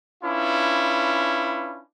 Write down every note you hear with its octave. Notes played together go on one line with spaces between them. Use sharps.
C#4 D4 E4 F4 B4